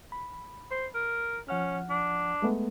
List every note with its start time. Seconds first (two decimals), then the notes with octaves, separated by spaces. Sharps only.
0.12 B5
0.71 C5
0.94 A#4
1.49 F3 C#4 F#5 F6
1.90 D4
2.42 G#3 A3 B3